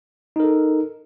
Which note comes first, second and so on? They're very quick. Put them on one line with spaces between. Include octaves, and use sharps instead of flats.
D#4 A#4 A4